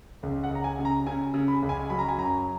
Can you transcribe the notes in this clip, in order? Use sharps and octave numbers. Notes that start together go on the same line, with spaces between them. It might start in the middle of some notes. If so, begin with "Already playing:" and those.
C#2
F#5
C#2 A#5
G#5
C#3
A#5
C#3 G#5
C#3
B5
C#2
G#5
F#3 B5
A#5
G#5
F#2 A#5